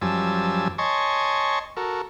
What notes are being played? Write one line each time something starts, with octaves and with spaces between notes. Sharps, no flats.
F#2 F3 G3 G#5 A5 E6
C#5 D#5 G#5 A5 C6 C#6
F#4 A4 A#4